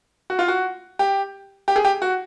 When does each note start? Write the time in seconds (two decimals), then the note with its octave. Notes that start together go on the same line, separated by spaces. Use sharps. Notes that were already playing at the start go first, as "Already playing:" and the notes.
0.30 F#4
0.39 F4
0.48 F#4
0.99 G4
1.68 G4
1.76 G#4
1.85 G4
2.02 F#4